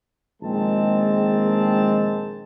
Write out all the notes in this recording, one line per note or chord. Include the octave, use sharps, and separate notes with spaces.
A#1 D#3 G#3 C4 A5